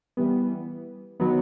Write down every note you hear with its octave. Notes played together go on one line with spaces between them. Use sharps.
E3 G3 B3
D#3 F#3 B3